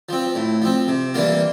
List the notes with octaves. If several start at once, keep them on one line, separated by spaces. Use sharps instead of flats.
F3 C4
A2
F3 C4
C3
E3 G3 A#3 F4